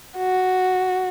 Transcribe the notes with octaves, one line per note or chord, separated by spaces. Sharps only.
F#4